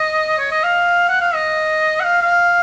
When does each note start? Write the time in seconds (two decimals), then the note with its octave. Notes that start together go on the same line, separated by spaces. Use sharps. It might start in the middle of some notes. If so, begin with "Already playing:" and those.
Already playing: D#5
0.38 C#5
0.51 D#5
0.63 F5
1.09 F#5
1.21 F5
1.34 D#5
2.00 F#5
2.04 F5
2.21 F5